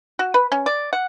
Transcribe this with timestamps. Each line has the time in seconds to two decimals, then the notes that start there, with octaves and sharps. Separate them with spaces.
0.19 F#4
0.34 B4
0.52 C#4
0.66 D5
0.93 F#5